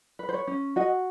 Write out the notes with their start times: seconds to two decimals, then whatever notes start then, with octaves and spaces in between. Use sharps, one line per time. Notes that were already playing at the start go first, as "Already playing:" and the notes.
0.19 B4
0.29 C5
0.34 C#5
0.47 C#4
0.76 F#4 D#5